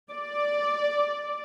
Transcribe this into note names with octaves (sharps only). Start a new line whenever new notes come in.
D5